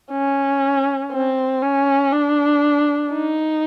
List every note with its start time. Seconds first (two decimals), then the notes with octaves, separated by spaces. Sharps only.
0.11 C#4
1.12 C4
1.61 C#4
2.12 D4
3.12 D#4